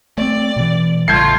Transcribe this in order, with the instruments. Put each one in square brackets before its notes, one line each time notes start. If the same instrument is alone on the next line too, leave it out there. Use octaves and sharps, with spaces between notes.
[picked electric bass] A3 C4 [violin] D5
[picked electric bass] B2 E3
[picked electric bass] A1 C#3 G3 [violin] A3 F4 [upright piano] G6 G#6 C7